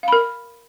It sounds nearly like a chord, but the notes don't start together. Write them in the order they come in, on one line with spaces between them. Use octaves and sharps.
F5 B5 A#4